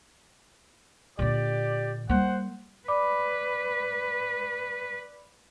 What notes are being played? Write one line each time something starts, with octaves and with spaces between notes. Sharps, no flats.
A#2 D3 G4 D5
G3 A#3 C5 F#5
B4 D5 B5 D6